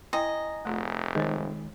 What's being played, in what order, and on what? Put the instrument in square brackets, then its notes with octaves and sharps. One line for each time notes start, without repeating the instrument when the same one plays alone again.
[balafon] E4 G5 [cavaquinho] D#5 [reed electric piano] G#5 A#5
[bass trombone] F1 [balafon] A3 F4 G#4
[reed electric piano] D#3 G#3 [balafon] C5 C#5